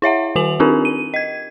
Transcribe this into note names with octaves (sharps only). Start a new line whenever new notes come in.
E4 C#5 E5 F#5
D#3 F#4 G#5 F7 F#7
C4 D4 D#4 F4 G4 A#4
D#7
D#5 G#6